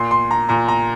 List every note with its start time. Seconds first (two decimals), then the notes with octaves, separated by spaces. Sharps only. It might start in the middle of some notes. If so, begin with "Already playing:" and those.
Already playing: A#2 C6
0.11 C6
0.31 A#5
0.49 A#2 A#5
0.68 A#5